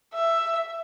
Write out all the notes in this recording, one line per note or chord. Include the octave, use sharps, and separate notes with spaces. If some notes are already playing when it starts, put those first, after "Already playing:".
E5